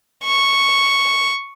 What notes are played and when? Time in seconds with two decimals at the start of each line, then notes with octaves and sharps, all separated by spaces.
0.25 C#6